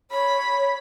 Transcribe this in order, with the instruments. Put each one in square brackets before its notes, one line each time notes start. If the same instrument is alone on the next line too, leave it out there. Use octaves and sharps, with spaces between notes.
[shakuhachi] C#5 [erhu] B5